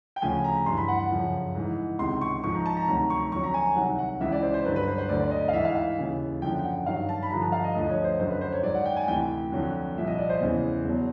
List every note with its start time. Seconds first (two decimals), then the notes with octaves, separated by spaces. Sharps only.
0.16 G5
0.22 D2 C#3 F3 G#5
0.44 A#5
0.66 G2 E3 C6
0.77 B5
0.88 F#5
0.99 F#5
1.11 F#2 C#3 F3
1.55 G#2 E3
1.99 C#2 C3 D#3 C6
2.21 C#6
2.43 G#2 F3 C#6
2.55 A#5
2.66 A5
2.77 A#5
2.88 D2 C3 D#3 F#3 A#5
3.10 C#6
3.32 F2 D3 F#3 C#6
3.44 A#5
3.54 G#5
3.76 C2 C3 D#3 F#3 F#5
3.99 F#5
4.21 C#2 C#3 E3 E5
4.32 D5
4.43 C5
4.54 C5
4.65 G2 D3 F#3 B4
4.76 B4
4.87 C5
4.98 C5
5.09 D2 D3 F#3 D5
5.24 D5
5.31 D#5
5.48 F5
5.53 G#2 E3 E5
5.65 F5
5.75 F5
5.98 D#2 C#3 E3
6.42 F#2 D3 F3 G5
6.59 G5
6.64 F#5
6.86 G2 D#3 F#3 F5
7.09 A5
7.23 B5
7.30 G2 D3 F3 A#5
7.42 A5
7.52 F5
7.64 D#5
7.75 D2 D3 F3 D#5
7.89 C#5
8.04 C5
8.19 F#2 D3 F#3 C5
8.30 B4
8.41 C5
8.53 C#5
8.63 G#2 D#3 F#3 D5
8.74 F#5
8.85 G5
8.96 G#5
9.07 D2 C3 E3 G5
9.52 F2 D3 F#3
9.96 C2 A#2 F3 E5
10.07 D#5
10.18 D5
10.29 C5
10.40 E2 C#3 E3
10.84 E2 B2 F#3